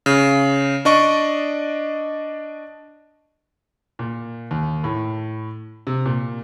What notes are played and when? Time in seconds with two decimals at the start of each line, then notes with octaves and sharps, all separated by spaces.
0.06 C#3
0.85 D4 D5 D#5 C#6
3.99 A#2
4.51 D#2
4.84 A2
5.87 C3
6.06 A#2